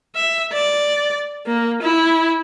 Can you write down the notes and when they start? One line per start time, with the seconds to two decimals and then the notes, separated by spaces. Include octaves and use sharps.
0.15 E5
0.53 D5
1.46 A#3
1.82 E4